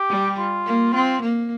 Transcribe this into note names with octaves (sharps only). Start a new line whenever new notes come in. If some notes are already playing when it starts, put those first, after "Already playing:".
Already playing: G4
G3
F4
A#3
C4 F4
A#3